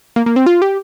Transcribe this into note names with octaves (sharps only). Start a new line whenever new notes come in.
A#3
A#3
C4
F4
G4